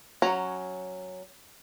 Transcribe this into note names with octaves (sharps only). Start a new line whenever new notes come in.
F#3 C#4 C#5 A#5